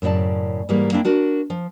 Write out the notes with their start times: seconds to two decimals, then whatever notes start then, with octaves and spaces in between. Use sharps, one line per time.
0.02 F#2 A2 C#3 D5 A5
0.69 G#2 E3 G3 A#3
0.92 A#3 C4 D4 E4
1.05 D4 F#4 A#4
1.50 F3